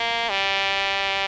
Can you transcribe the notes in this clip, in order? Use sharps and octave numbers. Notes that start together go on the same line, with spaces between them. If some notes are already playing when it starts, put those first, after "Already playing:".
Already playing: A#3
G3